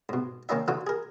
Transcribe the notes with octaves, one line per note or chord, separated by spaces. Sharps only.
G#2 B2
D#3 A#3 C#4 D#4 E5
D3 E3 D#4 F4 F#4
G#4 A#4